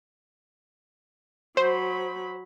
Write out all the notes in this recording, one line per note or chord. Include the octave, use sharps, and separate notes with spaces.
F#3 C5 B5